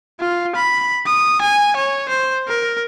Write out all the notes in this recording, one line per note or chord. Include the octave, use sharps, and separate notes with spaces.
F4
B5
D#6
G#5
C#5
C5
A#4